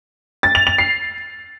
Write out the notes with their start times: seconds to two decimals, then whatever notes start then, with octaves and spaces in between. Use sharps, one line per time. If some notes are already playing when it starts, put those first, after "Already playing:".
0.43 A6
0.55 F7
0.67 F7
0.78 C7